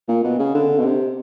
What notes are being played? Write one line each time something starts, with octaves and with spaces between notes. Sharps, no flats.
A#2
B2
C#3
D3
B2
C3